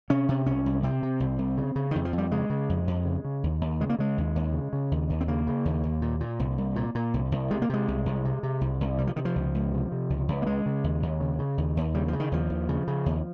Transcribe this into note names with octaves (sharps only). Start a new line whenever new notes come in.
C3 C#4
C3
C2 C#4
C2
C3 C4
C3
C2
C2
C#3
C#3
F2 D#3
F3
F2
G3
C#3 G#3
C#3
F2
F2
C#3
C#3
D#2
D#2
C#3 G#3
A#3
C#3 G#3
D#2
D#2
C#3
C#3
D#2
D#2
C4
C#3 A#3
C#3
D#2
D#2
A#2
A#2
C2
C2
A#2
A#2
C2
C2
C3 G#3
A#3
C3 G#3
C2
C2
C3
C3
C2
C2
C3 G3
F3
C3 D#3
F3
C#2
C#2
C3
C3
C#2
C#2
A#3
C#3 G#3
C#3
D#2
D#2
C#3
C#3
D#2
D#2
C#3 G3
C#3 F3
D#3
D#2 F3
D#2
C#3
C#3
D#2